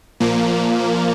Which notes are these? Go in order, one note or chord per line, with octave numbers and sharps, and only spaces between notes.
A#2 F3 A#3